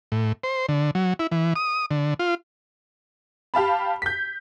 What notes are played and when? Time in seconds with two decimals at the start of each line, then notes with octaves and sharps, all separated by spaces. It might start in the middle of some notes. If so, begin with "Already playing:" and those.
0.12 A2
0.44 C5
0.69 D3
0.95 F#3
1.19 E4
1.31 E3
1.56 D#6
1.91 D3
2.19 F4
3.54 G4 F5 A5 B5
4.02 G6 B6